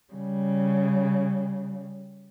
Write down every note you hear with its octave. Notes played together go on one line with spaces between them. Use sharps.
C#3 G3